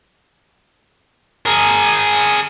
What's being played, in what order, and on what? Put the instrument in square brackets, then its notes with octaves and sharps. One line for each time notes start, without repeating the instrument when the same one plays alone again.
[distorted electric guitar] G#4 A#4